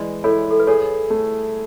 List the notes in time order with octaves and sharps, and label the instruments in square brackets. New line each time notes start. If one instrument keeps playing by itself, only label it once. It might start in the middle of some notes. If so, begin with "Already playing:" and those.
Already playing: [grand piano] E3 G#3 [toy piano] B4 D5
[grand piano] E4 [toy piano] A4 C#5
[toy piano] A4
B4
[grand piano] G#4 [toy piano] A4 C#5
[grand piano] A3